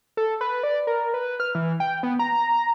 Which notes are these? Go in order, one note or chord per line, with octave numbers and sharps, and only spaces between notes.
A4
B4
D5
A#4
B4
F6
E3
G5
B3
A#5